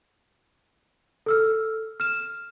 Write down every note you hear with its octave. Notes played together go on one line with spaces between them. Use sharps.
A4 E6 F6
F6 E7